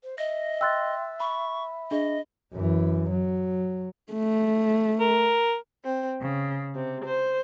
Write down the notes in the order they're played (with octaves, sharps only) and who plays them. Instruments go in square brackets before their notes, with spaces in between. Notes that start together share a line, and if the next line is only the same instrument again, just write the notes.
[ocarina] C5
[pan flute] D#5 [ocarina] E5 [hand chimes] A#6
[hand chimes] G5 C6 [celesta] E6 F#6 A6
[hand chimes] B5 [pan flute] C#6
[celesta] D4 G#4 [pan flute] D#5
[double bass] F#2 E3
F#3
[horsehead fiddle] A3
[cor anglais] A#4
[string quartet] C4
C#3
C3
C5